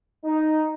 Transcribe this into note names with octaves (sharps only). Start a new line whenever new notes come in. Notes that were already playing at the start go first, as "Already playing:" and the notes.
D#4